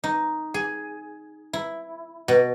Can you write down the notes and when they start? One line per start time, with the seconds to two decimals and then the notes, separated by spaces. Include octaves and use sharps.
0.04 D#4
0.54 G#4
1.53 E4
2.28 B2